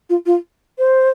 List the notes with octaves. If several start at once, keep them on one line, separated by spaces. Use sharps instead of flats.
F4
F4
C5